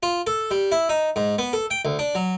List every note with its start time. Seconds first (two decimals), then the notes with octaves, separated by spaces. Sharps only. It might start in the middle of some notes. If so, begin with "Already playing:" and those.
0.03 F4
0.27 A4
0.51 G3
0.72 E4
0.89 D#4
1.16 G#2
1.38 B3
1.53 A4
1.70 G5
1.85 D2
1.99 D4
2.15 F#3